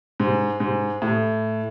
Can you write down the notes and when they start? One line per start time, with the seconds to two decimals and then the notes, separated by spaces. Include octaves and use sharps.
0.20 G#2
0.60 G#2
1.02 A2